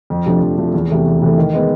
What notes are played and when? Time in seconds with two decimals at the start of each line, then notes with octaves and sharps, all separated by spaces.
0.10 F2
0.26 C3 F3 A3 D4
0.42 F2
0.58 C3 F3 A3 D4
0.74 E2
0.90 C3 E3 A3
1.06 E2
1.22 C3 E3 A3
1.38 D#3
1.53 G#3 B3